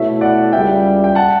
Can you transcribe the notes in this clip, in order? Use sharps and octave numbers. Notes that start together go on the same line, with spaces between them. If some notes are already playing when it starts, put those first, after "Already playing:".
Already playing: B2 A3 E4 C#5 E5
D5 F#5
C#2 C#3 G3 E5 G5
G5
F#5 A5